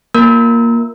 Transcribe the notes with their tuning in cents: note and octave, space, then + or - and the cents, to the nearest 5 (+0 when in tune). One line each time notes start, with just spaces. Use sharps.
A#3 +0 F4 +0 A#4 +0